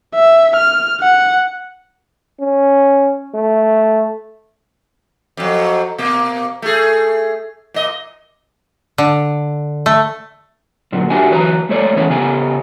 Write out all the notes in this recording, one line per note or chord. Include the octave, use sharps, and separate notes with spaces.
E5
F6
F#5
C#4
A3
F2 F#3
B2 A#3
A3 G#4
A#2 D#5
D3
A3
A#2 D3 F#3
D4 F#4 G4 E5 G#5
E3 F#3 B4 A#5
G#3 A3 C#5 D5
E3 B3 C#4 G#4 B4 C#5
C#3 B3 G4 G#5